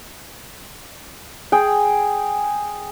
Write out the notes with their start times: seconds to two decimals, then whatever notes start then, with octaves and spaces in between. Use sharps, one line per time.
1.52 G#4 G5